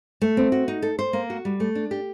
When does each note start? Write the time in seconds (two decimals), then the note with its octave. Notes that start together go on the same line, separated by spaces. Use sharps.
0.22 A3
0.37 C4
0.52 F#4
0.68 D#4
0.82 A4
0.99 C5
1.13 A#3
1.30 F#4
1.45 G3
1.60 A3
1.75 D4
1.91 G4